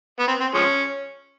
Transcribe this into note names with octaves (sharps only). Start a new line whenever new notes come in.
B3
C4
C4
F3 G#3 C#4